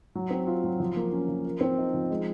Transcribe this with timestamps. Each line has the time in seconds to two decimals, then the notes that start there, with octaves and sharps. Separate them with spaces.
0.15 F#3
0.31 C4
0.47 F4
0.64 F#3
0.80 F3
0.97 A#3
1.12 C#4
1.28 F3
1.45 A#4
1.61 C4
1.78 D#4
1.94 F3
2.10 G#3